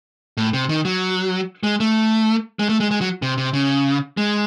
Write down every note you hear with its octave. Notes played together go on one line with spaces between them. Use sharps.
A2
C3
D#3
F#3
G#3
A3
G#3
A3
G#3
G#3
F#3
C3
C3
C#3
G#3